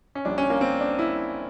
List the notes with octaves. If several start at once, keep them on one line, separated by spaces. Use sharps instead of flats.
C#4
A#1 A#2 G3 D4
C#4
A#3
C4
D4
E4